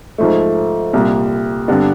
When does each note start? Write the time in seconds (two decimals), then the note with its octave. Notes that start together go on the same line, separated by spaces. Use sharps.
0.18 G#2 F3 A3
0.93 C2 A#2 G3
1.68 G2 D3 G3 B3 D4